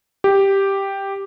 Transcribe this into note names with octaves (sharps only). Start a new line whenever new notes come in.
G4